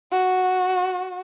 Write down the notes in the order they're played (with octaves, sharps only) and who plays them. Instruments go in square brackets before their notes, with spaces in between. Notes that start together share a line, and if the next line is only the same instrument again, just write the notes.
[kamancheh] F#4